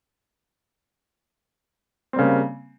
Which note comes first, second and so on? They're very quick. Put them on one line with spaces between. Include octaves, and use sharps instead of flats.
C4 G3 C#3 A#3